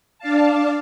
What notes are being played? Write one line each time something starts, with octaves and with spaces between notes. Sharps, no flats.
D4 D5 F5 A5